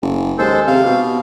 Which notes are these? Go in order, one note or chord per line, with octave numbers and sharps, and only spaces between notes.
F#1
D#2 G#3 A4 C5
C3 F5
B2